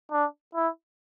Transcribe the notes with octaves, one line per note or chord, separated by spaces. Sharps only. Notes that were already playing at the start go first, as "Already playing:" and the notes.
D4
E4